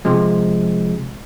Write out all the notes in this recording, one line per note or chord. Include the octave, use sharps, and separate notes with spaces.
C3 F3 G#3